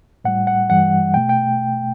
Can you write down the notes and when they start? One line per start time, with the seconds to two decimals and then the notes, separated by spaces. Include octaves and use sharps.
0.25 A2 G3 F#5
0.47 F#5
0.70 G2 E3 G3 F#5
1.14 B2 A3 G5
1.29 G5